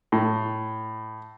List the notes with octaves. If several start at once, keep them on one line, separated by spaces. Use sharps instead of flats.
A2